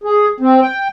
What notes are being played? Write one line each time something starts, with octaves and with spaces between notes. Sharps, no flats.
G#4
C4
G5